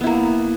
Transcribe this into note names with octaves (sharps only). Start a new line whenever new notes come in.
A#3 B3 E4